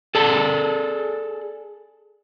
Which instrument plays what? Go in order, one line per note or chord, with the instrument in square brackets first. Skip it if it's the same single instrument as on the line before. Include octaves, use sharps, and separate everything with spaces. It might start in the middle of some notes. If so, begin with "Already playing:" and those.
[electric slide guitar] G#4 A4 D5 A5